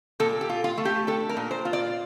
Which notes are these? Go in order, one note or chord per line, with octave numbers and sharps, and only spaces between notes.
A#2 A4
G4
F4
F4
A3
G4
D4 A4
A#4
A#2
C5
F4
D5